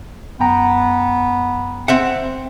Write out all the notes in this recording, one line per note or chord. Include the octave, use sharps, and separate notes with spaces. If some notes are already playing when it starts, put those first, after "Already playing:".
F#2 B3 G5 A#5
C4 E5 F#5